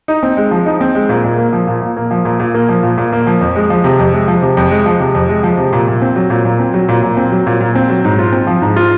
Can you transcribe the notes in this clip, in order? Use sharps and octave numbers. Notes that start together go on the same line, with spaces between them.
D#4
C4
G#3
F3
D#4
C4
G#3
A#2
A#2
A#3
F3
A#2
A#2
A#3
F3
A#2
A#2
A#3
F3
A#2
A#2
A#3
F3
F2
G#3
F3
C3
F2
G#3
F3
C3
F2
G#3
F3
C3
F2
G#3
F3
C3
A#2
A#2
C4
F#3
A#2
A#2
C4
F#3
A#2
A#2
C4
F#3
A#2
A#2
C4
F#3
G#2
F4
C4
F3
G#2
F4